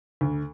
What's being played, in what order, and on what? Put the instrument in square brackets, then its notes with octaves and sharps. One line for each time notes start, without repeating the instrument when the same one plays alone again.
[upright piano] D2